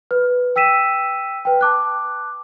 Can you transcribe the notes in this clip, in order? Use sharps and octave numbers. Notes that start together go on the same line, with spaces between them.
B4
G5 E6 B6 D#7 E7
B4 G5
A5 D6 F#6